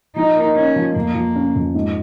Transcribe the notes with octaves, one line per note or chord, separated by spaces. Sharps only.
F3 D#4
A#3
C#4 D#4
F3
F2 A#3
F3
C#4
F2
G#2